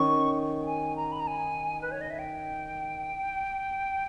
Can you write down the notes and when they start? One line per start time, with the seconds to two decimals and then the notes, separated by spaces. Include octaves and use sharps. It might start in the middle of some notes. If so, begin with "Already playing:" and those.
Already playing: D#3 C#4 C#6
0.61 G5
0.66 G#5
0.96 A#5
1.12 B5
1.20 A#5
1.27 G#5
1.82 B4
1.92 C#5
2.01 D#5
2.10 E5
2.19 G5